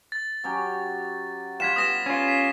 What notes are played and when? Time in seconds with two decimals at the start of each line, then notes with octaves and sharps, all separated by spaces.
0.12 A6
0.44 F#3 C#4 G4
1.60 G3 F4 F#5 G#6 B6 E7
1.76 G3 B3 D#6 A#6 E7
2.06 C#4 F4
2.28 B6